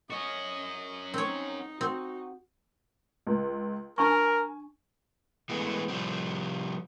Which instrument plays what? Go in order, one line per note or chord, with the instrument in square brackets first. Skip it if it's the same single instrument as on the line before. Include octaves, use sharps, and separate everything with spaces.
[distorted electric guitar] C#4 F#4 [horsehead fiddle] D#5
[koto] C4 C#5 [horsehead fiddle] D#4
[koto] C4 [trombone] F#4
[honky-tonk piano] C#2
[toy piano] D4 A5 C#6 [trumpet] A#4 [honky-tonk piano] G#5
[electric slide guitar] E3 G#3 A3 B3
C3 F3 G3 C4